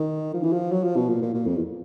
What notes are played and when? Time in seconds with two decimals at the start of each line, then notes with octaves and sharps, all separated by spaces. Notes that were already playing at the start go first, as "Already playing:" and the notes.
Already playing: D#3
0.34 F3
0.43 E3
0.53 F3
0.72 F#3
0.84 F3
0.97 B2
1.09 A#2
1.22 A#2
1.34 A#2
1.47 F2
1.56 E2